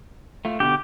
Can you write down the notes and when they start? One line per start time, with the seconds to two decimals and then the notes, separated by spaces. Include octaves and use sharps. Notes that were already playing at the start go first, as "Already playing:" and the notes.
0.45 A3 F4
0.60 B2 D3 G4